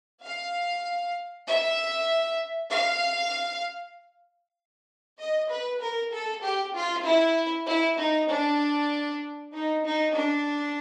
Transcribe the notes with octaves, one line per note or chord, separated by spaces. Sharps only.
F5
E5
F5
D#5
B4
A#4
A4
G4
F4
E4
E4
D#4
D4
D#4
D#4
D4